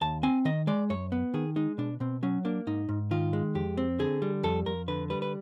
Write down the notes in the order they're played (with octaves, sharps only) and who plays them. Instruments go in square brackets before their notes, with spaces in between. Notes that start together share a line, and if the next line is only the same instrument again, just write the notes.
[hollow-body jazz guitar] D#2 A5
C4 G#5
D#3 D#5
G#3 D5
F#2 C#5
B3
D#3 G#4
G#3 D#4
B2 D4
B2 C4
F#3 C#4
A#3 D4
G#2 D#4
G#2
D#3 F4
G#3
F2 G4
C4
D3 G#4
G3
F2 A4
F2 A#4
D3 B4
G3 B4
B4